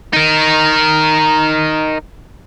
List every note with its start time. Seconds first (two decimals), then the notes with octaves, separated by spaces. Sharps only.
0.13 D#4 A#4